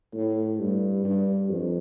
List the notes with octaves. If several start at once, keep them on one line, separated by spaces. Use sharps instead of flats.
A2
G2
G2
F2